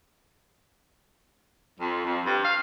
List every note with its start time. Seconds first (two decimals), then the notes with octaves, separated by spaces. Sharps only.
1.78 F2
2.05 F2
2.26 G2
2.45 F5